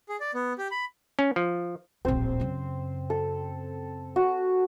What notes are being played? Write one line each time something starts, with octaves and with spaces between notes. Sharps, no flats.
G#4
D5
B3
G4
B5
C#4
F3
D1 A#1 C4 C5
F#2 C#3
A4
F#4